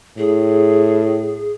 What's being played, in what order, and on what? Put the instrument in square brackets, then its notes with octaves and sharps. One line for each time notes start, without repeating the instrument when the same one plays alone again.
[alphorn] A2 [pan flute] G#4